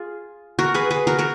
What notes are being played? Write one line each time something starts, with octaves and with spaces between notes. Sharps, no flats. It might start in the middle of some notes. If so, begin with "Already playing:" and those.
Already playing: F4 G#4
F#4 A#4
G#4 B4
G#4 B4
F#4 A#4
F#4 A#4